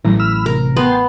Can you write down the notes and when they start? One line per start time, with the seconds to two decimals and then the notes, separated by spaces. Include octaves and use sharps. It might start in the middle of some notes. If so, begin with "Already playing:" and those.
0.05 A1 A2 E3 F#3 A#5
0.20 B5 E6 F6
0.46 C3 A#4
0.77 B3 G5 A5 C6